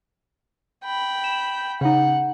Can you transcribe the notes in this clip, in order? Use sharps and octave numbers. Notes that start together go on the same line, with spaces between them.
G5 B5
E7
C#3 D#4 F#5